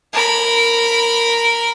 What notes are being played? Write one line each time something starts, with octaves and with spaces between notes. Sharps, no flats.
A#4 B5